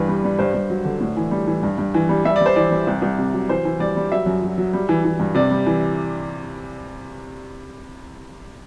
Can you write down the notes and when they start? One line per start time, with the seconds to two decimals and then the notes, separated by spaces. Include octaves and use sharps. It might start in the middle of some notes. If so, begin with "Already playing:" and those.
Already playing: G2 E3 B4
0.08 G3
0.24 G3
0.39 G2 C5
0.54 G2
0.70 F#3
0.85 D3
1.01 A2
1.17 E3
1.31 G3
1.47 E3
1.63 G2
1.78 G2
1.94 E3
2.09 G3
2.24 G3 E5
2.36 G3 D5
2.46 C5
2.56 E3 D5
2.71 G3
2.87 C2
3.02 C2
3.18 C3
3.33 F#3
3.49 E3 C5
3.65 E3
3.80 G3 D5
3.96 G3
4.12 F#3 E5
4.26 F#2
4.42 F#3
4.58 F#3
4.73 G3
4.89 E3
5.04 E3
5.20 G2
5.35 C3 D5
5.51 G3
5.66 E3